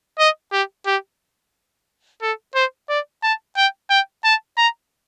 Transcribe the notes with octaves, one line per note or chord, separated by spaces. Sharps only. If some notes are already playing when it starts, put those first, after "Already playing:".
D#5
G4
G4
A4
C5
D5
A5
G5
G5
A5
A#5